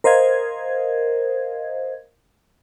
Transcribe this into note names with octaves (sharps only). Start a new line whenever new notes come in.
A#4 C5 D#5 F5 G#6